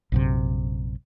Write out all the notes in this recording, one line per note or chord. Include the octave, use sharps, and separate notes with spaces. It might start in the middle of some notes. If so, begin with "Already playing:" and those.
A#1 F#2 C3